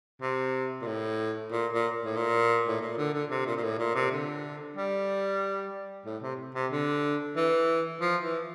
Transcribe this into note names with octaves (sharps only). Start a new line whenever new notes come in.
C3
A#2
A2
A#2
A#2
A2
A#2
A2
A#2
D3
D3
C3
A#2
A#2
A2
A#2
C3
D3
G3
A2
C3
C3
D3
E3
F3
E3